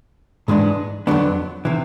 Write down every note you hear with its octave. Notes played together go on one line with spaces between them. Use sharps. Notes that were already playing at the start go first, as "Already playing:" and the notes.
G#2 E3 G#3 B3 D4
F2 D3 F#3 B3 D4
C3 E3